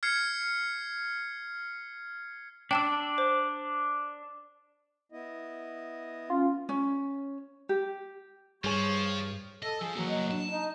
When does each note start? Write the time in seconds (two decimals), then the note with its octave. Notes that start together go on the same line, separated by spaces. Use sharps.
0.03 F6 G#6 C7 C#7
2.71 D4 G5 A5 E6
3.18 C5
5.12 B3 E4 D#5
6.30 C#4 F4
6.69 C#4
7.69 G4
8.64 G2 F3 G3 G#4 C#5 D#7
9.63 A4 D#5
9.81 F3 G#4
9.96 E3 F#3 A#3 F#4
10.08 D#5
10.31 D4 A5
10.51 D#4 D#5